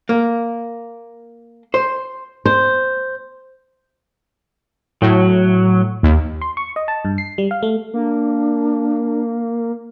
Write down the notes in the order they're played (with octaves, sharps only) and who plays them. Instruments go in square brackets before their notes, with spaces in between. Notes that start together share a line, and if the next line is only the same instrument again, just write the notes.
[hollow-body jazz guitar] A#3
C5
[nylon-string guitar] C5
[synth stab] A2 [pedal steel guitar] F#3
[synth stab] D#2
[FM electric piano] C6
C#6
D#5
A5
G2
C7
G3
F5
A3
[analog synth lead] A#3 [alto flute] D4